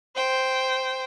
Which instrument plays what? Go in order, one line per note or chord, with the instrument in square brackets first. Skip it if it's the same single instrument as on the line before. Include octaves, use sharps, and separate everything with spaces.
[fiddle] C5 G5